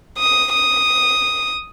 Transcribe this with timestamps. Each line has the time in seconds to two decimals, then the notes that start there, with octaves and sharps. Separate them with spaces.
0.18 D#6
0.53 D#6